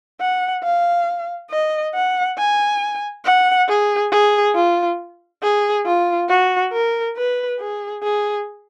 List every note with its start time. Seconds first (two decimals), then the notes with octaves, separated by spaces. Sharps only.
0.21 F#5
0.63 F5
1.51 D#5
1.94 F#5
2.38 G#5
3.25 F#5
3.69 G#4
4.12 G#4
4.55 F4
5.43 G#4
5.86 F4
6.29 F#4
6.73 A#4
7.17 B4
7.60 G#4
8.03 G#4